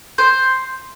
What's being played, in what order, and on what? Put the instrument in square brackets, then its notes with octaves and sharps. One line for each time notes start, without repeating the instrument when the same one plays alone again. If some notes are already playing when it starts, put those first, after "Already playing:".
[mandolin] C5